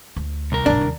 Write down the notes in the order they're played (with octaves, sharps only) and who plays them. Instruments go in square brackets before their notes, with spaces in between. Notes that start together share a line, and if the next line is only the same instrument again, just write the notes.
[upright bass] D2
[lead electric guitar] C2 A#4
[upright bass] A1 D2 [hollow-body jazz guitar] D4
[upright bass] D#2